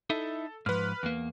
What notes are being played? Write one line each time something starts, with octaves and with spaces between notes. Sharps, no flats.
D#4 E4 A4 E5
G#2 F3 B4 F6
E2 A#3